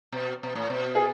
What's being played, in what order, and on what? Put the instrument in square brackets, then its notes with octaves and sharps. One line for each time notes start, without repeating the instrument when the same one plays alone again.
[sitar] B2
B2
A2
B2
[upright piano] G#4